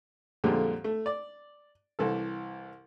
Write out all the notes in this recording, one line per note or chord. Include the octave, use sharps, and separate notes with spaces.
F2 A#2 D3 G3 G#3
A3
D5
C2 E3 A4